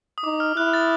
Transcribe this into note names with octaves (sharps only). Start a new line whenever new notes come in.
D#6
D#4 D6
F6
E4 F#6
A6